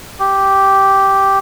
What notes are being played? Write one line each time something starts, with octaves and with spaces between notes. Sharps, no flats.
G4